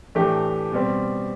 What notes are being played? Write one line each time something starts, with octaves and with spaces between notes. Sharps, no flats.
A2 E3 A3 D4 G4
B2 G3 C4